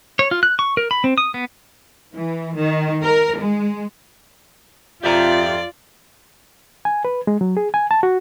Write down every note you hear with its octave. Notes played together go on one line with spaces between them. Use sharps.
C#5
F4
F#6
C#6
A#4
B5
C4
D#6
B3
E3
D#3
A#4
G#3
F2 F4 G4 D5 E5 A#5
G#5
B4
G#3
F#3
G#4
G#5
A5
F#4